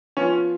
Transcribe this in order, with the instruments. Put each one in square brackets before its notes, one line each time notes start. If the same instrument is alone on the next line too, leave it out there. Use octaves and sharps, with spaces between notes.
[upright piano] F3 B3 F4 [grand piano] C#4